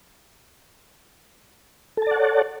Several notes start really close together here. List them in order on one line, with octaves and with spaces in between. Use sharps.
A4 A5 D5 F#5 C#5